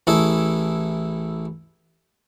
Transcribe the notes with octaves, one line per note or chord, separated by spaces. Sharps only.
A1 E4 G#4 A4